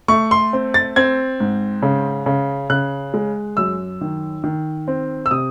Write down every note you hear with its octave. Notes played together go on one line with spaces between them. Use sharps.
A3 C#6
C6
C4
A6
C4 G#6
G#2
C#3
C#3
C#3 F#6
G#3
F#2 E6
D#3
D#3
C4
E6
C3 D#6